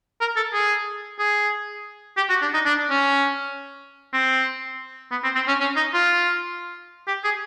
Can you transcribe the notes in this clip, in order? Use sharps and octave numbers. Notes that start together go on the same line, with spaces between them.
A#4
A4
G#4
G#4
G4
F#4
D4
D#4
D4
C#4
C4
B3
C4
C4
C#4
C#4
D#4
F4
G4
G#4